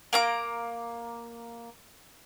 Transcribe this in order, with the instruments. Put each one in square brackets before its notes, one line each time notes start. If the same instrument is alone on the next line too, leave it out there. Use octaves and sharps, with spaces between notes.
[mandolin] A#3 A#5 D6